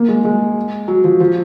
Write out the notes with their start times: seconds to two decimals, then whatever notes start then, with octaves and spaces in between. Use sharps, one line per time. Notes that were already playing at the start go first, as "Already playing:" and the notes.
Already playing: A#3
0.08 G#3
0.25 G#3
0.88 F#3
1.04 F3
1.20 F3